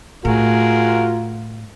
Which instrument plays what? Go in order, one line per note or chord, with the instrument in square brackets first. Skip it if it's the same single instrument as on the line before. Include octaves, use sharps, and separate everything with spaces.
[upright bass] A2 [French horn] F4 [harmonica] F#4 G#4 A#4